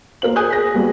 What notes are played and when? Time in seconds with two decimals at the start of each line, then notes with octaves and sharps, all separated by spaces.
0.22 A#3 A#4 C5 F#7
0.36 G#4 G#5 D#6 F#6 G6
0.50 A#6 B6
0.74 G3 A#3 B3 F#4 G#4